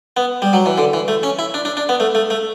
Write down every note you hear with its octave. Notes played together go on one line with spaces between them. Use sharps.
B3
G3
F#3
E3
D3
E3
A3
C#4
E4
D4
D4
D4
B3
A3
A3
A3